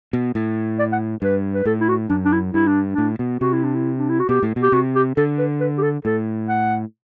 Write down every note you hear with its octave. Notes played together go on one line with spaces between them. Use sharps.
B2
A2
D5
F#5
G2 B4
B4
A2 A4
E4
F#4
F#2 D4
D4
E4
G2 E4
D4
D4
A2
B2
C3 F#4
E4
D4
E4
D4
E4
F#4
B2 G4
A2
B2
G4
C3 F#4
G4
D3 A4
B4
B4
G4
A4
A2 A4
F#5